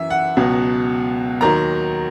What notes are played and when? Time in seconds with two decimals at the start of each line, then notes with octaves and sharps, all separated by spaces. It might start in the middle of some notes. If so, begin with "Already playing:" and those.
Already playing: F#2 E3 E5
0.10 F#5
0.37 C#2 B2 F#3
1.41 D#2 D#3 F#3 A#5